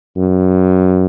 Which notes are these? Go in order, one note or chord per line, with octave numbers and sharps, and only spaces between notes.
F#2